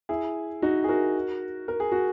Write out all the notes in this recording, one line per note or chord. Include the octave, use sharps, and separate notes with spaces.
E4 G#4
D#4 F#4
G#4
F#4 A#4
A#4
G#4
F#4